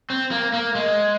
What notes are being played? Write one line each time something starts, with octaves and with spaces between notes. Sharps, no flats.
C4
A#3
A#3
G#3